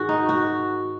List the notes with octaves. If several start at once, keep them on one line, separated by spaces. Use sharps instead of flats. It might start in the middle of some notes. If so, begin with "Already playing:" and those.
Already playing: G#2 D#3 F#4 G#4
D#4
F#4